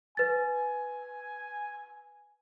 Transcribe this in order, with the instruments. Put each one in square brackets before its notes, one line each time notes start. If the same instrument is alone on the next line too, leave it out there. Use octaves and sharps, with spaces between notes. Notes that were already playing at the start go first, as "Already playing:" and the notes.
[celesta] B4 A6 [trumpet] G#5